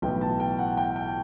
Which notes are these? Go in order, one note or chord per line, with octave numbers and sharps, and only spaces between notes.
B1 A2 E3 B3 G5
A5
G5
F#5
G5
G5